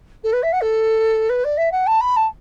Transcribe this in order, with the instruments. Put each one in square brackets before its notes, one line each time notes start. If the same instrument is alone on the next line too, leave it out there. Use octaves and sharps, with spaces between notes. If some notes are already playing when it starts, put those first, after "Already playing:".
[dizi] A4
B4
E5
F#5
A4
B4
D5
E5
F#5
A5
B5
A5